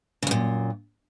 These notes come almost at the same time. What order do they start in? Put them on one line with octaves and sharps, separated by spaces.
C#3 F#2 A#2